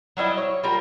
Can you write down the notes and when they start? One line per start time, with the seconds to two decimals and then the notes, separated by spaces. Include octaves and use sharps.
0.17 F#3 G3 E4 D#5
0.37 C#5
0.64 G3 F4 A#4